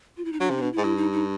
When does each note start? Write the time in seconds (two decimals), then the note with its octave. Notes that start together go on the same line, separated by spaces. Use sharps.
0.17 F4
0.25 E4
0.33 D#4
0.40 F#3 D4
0.50 C3 C#4
0.57 D#4
0.61 B2 D4
0.73 E4
0.78 G#2
0.83 G2 E4
0.97 D#4
1.12 D#4